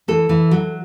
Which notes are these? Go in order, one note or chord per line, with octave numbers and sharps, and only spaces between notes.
E3 A4
E3
F#3